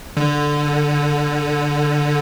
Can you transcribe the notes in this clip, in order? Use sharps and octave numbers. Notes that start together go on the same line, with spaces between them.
D3